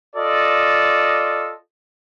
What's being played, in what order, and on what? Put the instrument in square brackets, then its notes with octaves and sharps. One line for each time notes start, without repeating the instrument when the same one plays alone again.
[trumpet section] F4 A4 D5 D#5